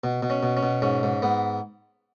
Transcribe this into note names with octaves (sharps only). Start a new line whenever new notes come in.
B2
B2
C#4
B2
C#4
B2
G#2 C#4
G#2
G#2 B3